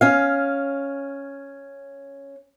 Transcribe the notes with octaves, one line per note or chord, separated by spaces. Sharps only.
C#4 F5